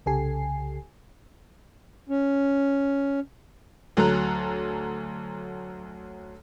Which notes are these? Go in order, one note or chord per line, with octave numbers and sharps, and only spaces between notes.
C2 C#3 G4 A4 G#5 C7
C#4
D2 F#3 A4 A#5 F#6